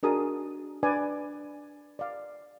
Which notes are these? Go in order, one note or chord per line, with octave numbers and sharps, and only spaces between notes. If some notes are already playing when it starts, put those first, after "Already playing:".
D4 F#4 G#4 A#4 A5 D#6
D4 B4 D5 G#5
D5 F5